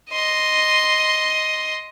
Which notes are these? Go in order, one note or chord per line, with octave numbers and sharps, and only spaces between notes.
D#5 C6